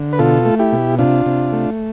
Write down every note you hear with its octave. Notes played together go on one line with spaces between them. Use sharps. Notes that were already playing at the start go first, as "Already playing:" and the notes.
Already playing: D3
B4
B2 F4 A4
A3
E4 G4
B2
C3 D4 F4
C3
A3